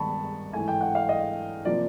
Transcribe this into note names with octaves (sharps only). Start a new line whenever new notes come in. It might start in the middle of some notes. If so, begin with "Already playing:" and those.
Already playing: G2 D#3 G#3 B3 A5 B5 C#6
G#2 E3 A3 G#5
G5
F#5
F5
D#5
C3 F3 A#3 D5